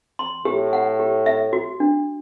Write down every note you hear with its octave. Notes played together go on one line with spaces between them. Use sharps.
C6
A2 G4
F#5
G4
E5
F#4
D4